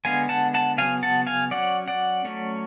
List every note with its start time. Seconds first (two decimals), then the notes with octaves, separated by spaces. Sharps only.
0.05 D3 G#3 B3 F5 G#5
0.29 F#5 A5
0.54 F#5 A5
0.78 C#3 F#3 B3 F5 G#5
1.03 F#5 A5
1.27 F5 G#5
1.51 F#3 C#4 D5 F#5
1.88 D5 F#5
2.25 F#3 A3 C#4